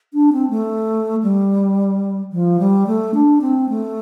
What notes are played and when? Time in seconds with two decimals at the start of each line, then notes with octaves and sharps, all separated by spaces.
0.13 D4
0.32 C4
0.50 A3
1.23 G3
2.32 F3
2.59 G3
2.87 A3
3.14 D4
3.41 C4
3.69 A3